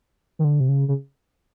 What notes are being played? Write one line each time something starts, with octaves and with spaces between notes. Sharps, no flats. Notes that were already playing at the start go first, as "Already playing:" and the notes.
D#3
D3
C3
C#3
C#3